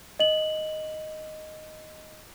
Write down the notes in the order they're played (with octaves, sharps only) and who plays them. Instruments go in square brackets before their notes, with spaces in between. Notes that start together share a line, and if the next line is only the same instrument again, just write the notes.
[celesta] D#5 F#7